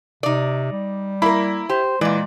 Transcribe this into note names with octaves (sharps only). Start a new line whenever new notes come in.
C3 D#4 D5
G3
A#3 E4 A#4 B5
G4 C5
A#2 E3 G#3 D5